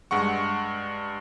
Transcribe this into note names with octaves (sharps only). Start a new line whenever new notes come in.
G2 G#3 F#5 C#6